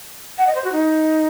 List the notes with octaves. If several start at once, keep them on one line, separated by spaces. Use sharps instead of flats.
F#5
D#5
C5
F#4
D#4